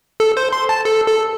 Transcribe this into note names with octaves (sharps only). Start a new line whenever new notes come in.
A4
C5
C6
A5
A4
A4